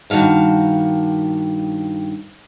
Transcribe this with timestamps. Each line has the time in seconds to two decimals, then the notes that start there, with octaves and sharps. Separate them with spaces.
0.10 G2 D#3 F#4 F5 A5